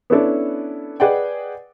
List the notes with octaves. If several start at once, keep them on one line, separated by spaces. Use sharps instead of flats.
B3 C#4 D4 E4 A4 D5
G#4 B4 D5 D#5 F#5 G5